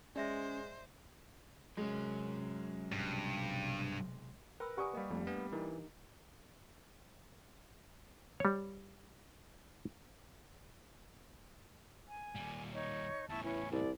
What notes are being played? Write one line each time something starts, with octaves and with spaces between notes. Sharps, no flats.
G#3 C#4 C5 D5 E5 A#6
C3 F#3 G#3 C#4
B1 G2 C3
A#4 B4 G5 B5 E6
G4 D5 F#5 G#5 C#6 D#6
G3 A#3 A#4 D#5 F5
F2 A3
B3 D4
E3 D#4 G4 A#4
G3 C#5
G#5
D#2 G3
D#4 C#5
E2 A2 E4 A5 C#6
E3 C#4 B4 C#5
C2 D5